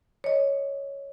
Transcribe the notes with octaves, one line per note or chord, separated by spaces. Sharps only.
C#5 D#5